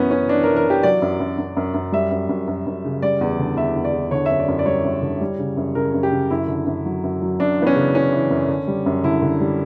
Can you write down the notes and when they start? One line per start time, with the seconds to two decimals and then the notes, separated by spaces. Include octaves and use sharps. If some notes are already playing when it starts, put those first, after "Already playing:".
Already playing: F#2 E3 B3 C#4
0.11 E3 C#4
0.28 E3 D4
0.43 E3 A#4
0.56 A#4
0.66 E3 G4
0.83 F#3 D5
1.02 F#2
1.20 F#2
1.38 F#2
1.57 F#2
1.74 F#2
1.92 G3 E5
2.11 F#2
2.29 F#2
2.48 F#2
2.66 F#2
2.85 C#3
3.02 G3 D5
3.21 E2
3.39 D3
3.56 E2 E5
3.76 E2
3.85 D5
3.93 E2
4.11 D3 C#5
4.26 F#2 E5
4.39 D5
4.48 F#2
4.59 D5
4.66 G3 C#5
4.84 F#2
5.02 D3
5.21 G3
5.39 C#3
5.57 F#2
5.75 C#3 A#4
5.94 F#2
6.03 G4
6.12 C#3
6.30 F#2 E4
6.48 D3
6.67 F#2
6.85 F#3
7.04 F#2
7.22 F#3
7.40 F#2 D4
7.57 E3 B3
7.67 C#4
7.76 C#3
7.95 E3 C#4
8.12 E3
8.31 F#2
8.48 D3
8.68 G3
8.86 F#2
9.04 D3 E4
9.22 D3
9.41 G3